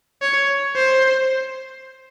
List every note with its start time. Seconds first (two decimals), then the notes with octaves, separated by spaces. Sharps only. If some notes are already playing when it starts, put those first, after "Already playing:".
0.22 C#5
0.76 C5